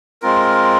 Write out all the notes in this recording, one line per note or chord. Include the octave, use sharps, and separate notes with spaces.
G#3 C4 F4 A#4